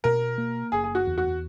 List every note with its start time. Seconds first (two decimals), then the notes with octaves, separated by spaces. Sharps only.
0.04 B2 A#4
0.38 A#3
0.72 F#1 G#4
0.84 G#4
0.95 F#4
1.07 E2
1.18 F#4